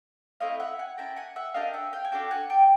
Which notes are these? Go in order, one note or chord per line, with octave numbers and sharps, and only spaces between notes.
A3 C4 E4 D#5 F5
E5 F#5
F#5 G#5
A#3 C#4 E4 G5 A5
F#5 G#5
E5 F#5
A#3 D4 G4 D#5 F5
E5 F#5
F5 G5
G#5
D4 F#4 A4 F5 G5
F#5 G#5
G5 A5